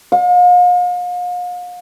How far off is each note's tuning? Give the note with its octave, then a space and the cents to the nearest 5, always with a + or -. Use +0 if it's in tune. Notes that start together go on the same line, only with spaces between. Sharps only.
F5 +40